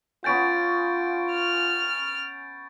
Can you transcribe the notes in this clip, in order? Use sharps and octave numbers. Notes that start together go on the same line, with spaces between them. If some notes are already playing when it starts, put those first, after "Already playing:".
B3 C#4 F4 G#5 G6 A6 D7
F6